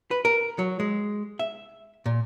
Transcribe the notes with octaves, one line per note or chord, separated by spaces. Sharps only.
B4
A#4
F#3
G#3
E5
A#2